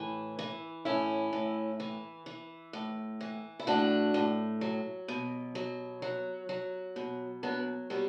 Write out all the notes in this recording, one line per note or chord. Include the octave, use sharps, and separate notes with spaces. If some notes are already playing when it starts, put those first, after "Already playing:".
Already playing: A2 E3
E3
A2 C#4 E4
A2
E3
E3
A2
E3
E4
A2 D4 F#4
A2
F#3
B2
F#3
F#3
F#3
B2
F#3 B3 D4
F#3 G3 B3